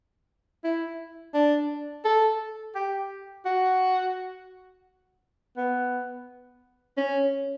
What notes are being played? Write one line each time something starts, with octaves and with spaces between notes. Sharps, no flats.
E4
D4
A4
G4
F#4
B3
C#4